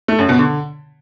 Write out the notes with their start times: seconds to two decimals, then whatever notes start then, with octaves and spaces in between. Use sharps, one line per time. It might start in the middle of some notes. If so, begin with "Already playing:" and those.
0.08 A3
0.19 F#2
0.29 B2
0.39 D3